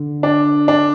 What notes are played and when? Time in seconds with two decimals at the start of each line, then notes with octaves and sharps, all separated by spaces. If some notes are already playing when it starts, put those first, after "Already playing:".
Already playing: D3
0.23 D4
0.68 D4